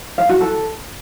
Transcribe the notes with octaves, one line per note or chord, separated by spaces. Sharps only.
F5
F#4
A4